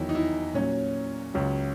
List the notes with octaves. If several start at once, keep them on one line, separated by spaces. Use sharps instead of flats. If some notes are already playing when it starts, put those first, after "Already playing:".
Already playing: E2 D#3 F#3 E4
D#4
E4
A#2 F#3 C#4
C#2 C#3 F#3